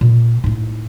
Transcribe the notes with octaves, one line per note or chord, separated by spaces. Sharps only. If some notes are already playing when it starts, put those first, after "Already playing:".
A#2
A2 D#4